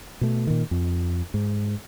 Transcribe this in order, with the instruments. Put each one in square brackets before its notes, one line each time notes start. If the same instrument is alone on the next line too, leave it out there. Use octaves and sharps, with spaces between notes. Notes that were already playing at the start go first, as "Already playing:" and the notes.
[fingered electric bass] B2 A3
A#2 D#3
F2
G#2